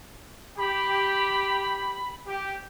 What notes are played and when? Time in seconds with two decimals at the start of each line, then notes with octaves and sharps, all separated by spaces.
0.58 G4 B5
2.27 G4